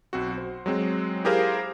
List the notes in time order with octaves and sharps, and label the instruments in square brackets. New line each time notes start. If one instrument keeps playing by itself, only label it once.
[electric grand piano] B1 C4 F#4
C5
F#3 G#3 C4
E4 G4 G#4 A#4 C5 F5